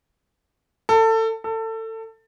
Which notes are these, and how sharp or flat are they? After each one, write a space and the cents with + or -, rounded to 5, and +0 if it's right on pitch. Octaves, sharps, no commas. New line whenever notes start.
A4 +25
A4 +25